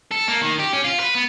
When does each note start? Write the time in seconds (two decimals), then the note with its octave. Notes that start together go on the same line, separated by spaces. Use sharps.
0.12 A4
0.28 A#3
0.42 D#3
0.59 G4
0.73 C#4
0.84 F4
0.99 B4
1.15 B3